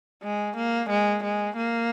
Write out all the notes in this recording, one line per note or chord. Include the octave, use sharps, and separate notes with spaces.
G#3
A#3
G#3
G#3
A#3